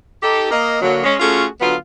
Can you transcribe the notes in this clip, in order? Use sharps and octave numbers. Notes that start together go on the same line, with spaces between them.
D#4 G4 A4
A#3 D#5
D3 F#3 A#3
G#3 C#4
A3 C#4 F4 F#4 G#4 A4
D3 F#3 B3 F4 F5